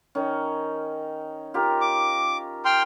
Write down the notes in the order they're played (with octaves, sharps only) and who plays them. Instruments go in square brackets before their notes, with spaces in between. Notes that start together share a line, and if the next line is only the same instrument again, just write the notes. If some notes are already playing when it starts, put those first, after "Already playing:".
[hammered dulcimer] D#3 C#4
F4 G4 A#4
[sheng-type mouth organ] D6
G5 C6 F6